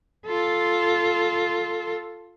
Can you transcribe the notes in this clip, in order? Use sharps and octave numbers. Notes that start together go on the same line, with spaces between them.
F4 A4